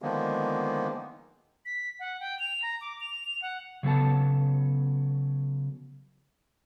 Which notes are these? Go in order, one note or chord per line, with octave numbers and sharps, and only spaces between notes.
D3 D#3 F3 G#3 A#3 B3
B6
F#5
G5
F7
A#5
D6
F7
F#5
C#3 F#3 B3 A4 A5